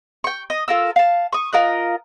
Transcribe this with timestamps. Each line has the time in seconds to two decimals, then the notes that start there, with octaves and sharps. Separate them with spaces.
0.24 G5 C#6
0.50 D#5
0.68 F4 A4 A#4 E6
0.96 F5 A5
1.33 C#6 D#6
1.53 F4 A#4 D#5 F#6